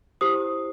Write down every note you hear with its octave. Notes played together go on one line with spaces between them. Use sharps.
E4 G4 C5 D#6